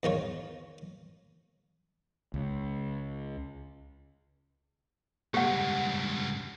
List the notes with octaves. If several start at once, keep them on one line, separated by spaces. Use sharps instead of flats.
E2 D#3 F4 C#5
C#2
C#2 G2 G4 F#5